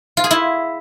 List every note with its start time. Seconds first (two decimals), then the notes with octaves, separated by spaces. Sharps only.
0.17 F4
0.24 G#4
0.31 E4